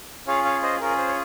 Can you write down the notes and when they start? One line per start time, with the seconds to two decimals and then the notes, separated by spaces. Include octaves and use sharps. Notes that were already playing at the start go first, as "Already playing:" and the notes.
0.27 C#4 F4 G#4 C#5 F5
0.45 C#5 F5
0.63 C5 D#5
0.80 C#4 F4 G#4 A#4
0.98 C5
1.08 C#5